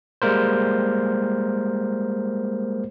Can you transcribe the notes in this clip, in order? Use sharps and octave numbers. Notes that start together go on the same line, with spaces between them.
G3 G#3 A#3 A#4 C5